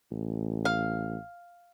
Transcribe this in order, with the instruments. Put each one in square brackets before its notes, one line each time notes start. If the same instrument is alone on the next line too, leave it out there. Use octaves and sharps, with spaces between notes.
[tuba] A1
[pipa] F5